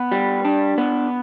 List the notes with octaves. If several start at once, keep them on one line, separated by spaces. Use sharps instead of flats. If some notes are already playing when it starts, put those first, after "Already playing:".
Already playing: B3
G3
D4
B3